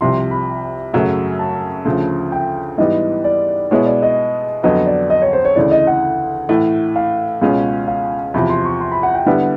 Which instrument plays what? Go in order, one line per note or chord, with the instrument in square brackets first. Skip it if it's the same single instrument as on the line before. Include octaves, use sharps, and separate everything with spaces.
[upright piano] C2 C3 F3 [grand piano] C6
[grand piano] B5
[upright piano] F#2 C#3 F#3 A3 C#4
[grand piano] A5
[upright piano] D2 C#3 F3
[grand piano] G5
[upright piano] G#2 E3 G3 B3 [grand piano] D#5
[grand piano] D5
[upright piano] B2 G#3 B3 E4 [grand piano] C#5
[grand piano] D5
D#5
[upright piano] F2 D3 F#3 B3 [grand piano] D#5
[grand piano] D5
D#5
C#5
C5
C#5
[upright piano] D2 C#3 E3 [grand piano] D5
[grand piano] D#5
F#5
[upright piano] A2 E3 A3
[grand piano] F5
[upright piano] C#2 B2 G#3 C#4 F4 [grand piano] F5
[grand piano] F5
[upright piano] E2 C3 F3 [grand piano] B5
[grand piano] C6
C#6
C6
B5
F#5
G5
[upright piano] D3 G3 B3 E4 [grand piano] F#5